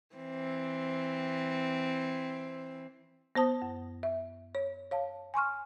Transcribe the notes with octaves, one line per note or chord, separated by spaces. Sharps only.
E3 C4
B3 C5 A5 D#6
F#2
E5
C#5
C#5 F5 A5
G#5 C6 C#6 F6